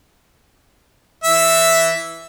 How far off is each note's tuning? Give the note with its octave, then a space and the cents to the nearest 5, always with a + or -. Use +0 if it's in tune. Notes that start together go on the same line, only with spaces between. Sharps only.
E3 +0 E5 +0